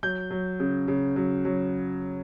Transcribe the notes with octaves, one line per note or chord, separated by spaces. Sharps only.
F#3 G6
F#3
C#3
C#3
F#3
F#3